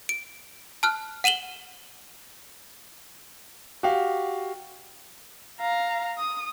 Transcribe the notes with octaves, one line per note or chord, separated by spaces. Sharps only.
D7
A5 F6 F#6
F#5 D#7 E7 F#7 G7
F#4 G4 F5
F5 A#5
D#6